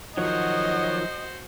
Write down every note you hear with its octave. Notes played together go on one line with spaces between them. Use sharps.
D#3 F3 F#3 F#4 C5 C#5 D#5 F#5